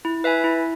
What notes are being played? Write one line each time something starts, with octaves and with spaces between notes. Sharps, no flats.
E4
B4 E5 G#5
E4